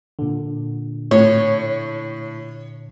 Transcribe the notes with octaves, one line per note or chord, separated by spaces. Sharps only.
A#2 D3
A2 C#5